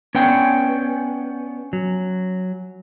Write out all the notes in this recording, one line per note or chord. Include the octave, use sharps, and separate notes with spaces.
B3 C#4 D4 C#5 G5
F#3